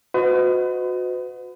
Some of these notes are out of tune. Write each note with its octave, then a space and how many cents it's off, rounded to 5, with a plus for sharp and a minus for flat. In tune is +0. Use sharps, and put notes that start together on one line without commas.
F#4 -25 B4 +40 D#5 +0